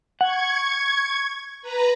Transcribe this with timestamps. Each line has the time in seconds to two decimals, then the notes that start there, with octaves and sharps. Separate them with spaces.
0.21 F#5 C#6 G#6
1.62 B4 A#5